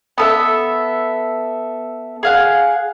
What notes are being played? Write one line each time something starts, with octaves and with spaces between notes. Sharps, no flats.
B3 A4 E5
G#4 F5 F#5